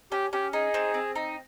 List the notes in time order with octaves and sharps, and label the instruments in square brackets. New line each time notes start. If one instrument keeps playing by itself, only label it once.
[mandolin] C#4 [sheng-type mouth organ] G4
[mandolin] C#4 [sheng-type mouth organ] G4
[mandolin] D#4 [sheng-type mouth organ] G#4
[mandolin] C4
C4
D#4